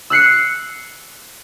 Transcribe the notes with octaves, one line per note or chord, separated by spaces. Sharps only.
E6 F#6 C7 C#7